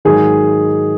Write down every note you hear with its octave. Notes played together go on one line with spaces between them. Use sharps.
G#2 D#3 F#3 G#4